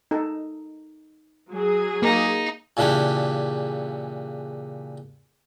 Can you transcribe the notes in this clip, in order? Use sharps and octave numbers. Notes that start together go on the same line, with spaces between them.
D#4 A4
F#3 G#4
A#3 D#4
A#2 C#3 E3 D4 G4